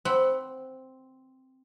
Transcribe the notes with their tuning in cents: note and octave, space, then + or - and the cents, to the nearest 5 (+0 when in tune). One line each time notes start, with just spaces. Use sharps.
C4 +0 F#5 +20 B5 +0